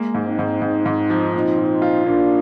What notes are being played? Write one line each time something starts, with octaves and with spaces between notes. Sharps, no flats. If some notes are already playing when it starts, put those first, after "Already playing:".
Already playing: G#3 A#3
G#2
C4 D#4
G#2
G#2
G#2
F3
A#2 C4 D#4
A#2
F4
A#2 A#3 D4